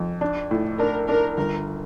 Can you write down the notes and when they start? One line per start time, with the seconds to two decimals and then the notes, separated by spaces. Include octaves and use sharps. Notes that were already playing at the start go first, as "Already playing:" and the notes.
Already playing: F2
0.21 D4
0.51 A2
0.79 D4 A#4
1.08 D4 A#4
1.37 G1 A#4